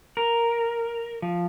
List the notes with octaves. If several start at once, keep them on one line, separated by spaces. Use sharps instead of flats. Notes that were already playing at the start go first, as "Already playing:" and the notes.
A#4
F3